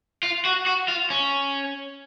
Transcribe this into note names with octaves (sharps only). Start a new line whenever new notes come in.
F4
F#4
F#4
F4
C#4